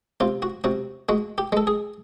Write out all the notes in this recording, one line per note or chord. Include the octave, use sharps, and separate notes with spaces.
C3 F4
F#4
C3 F#4
G#3 F#4
G4
G#3 A4
G#4